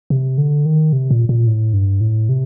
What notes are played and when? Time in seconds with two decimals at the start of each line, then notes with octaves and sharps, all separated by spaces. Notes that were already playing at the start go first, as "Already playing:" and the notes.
0.10 C3
0.38 D3
0.66 D#3
0.93 C3
1.11 A#2
1.29 A#2
1.47 A2
1.74 G2
2.01 A2
2.29 C3